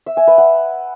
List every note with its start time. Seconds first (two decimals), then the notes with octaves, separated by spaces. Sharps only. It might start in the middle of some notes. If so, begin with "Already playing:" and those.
0.06 E5
0.17 G#5
0.27 B4
0.38 F#5